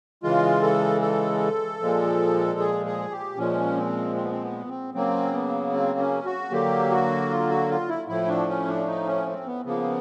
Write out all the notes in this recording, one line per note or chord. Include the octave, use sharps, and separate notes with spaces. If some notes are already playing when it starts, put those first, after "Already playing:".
C#3 E3 G#3 F4
A4
A4
A#2 F3 G#3
G#4
G#4
G4
A#2 F3 G#3 C#4
C4
C4
B3
C4
B3
C4
C#3 F#3 A#3 C4
B3
C4
C#4
F#4
D3 F#3 A#3 G4
F#4
F4
F#4
F4
E4
A2 F3 A3 E4
D4
C#4
D4
D#4
C#4
C4
B3
C#3 F3 A#3 B3